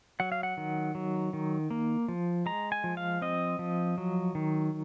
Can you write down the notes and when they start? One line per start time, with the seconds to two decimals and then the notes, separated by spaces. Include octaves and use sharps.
0.20 F#3 F#5
0.32 F5
0.43 F#5
0.57 D#3
0.95 F#3
1.33 D#3
1.70 A#3
2.08 F3
2.46 G#3 A#5
2.72 G#5
2.84 F3
2.97 F5
3.22 C4 D#5
3.59 F3
3.98 F#3
4.35 D#3